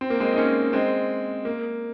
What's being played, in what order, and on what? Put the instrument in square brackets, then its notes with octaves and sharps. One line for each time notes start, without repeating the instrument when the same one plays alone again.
[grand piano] C4
A#3
G#3 C4
D#4
A#3 C#4
G#3 C4
A#3